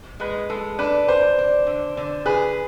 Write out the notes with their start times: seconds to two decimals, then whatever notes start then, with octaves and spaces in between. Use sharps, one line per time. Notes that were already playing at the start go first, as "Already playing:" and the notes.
0.20 G#3 B4
0.50 G#3 A4
0.79 D4 B4
1.08 D4 C5
1.38 D4
1.67 D3
1.97 D3
2.26 G#4 B4